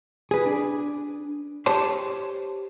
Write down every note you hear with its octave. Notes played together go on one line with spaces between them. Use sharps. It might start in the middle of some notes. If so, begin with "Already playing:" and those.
G#4 B4
D4
G4 C5 C#5 A5 C6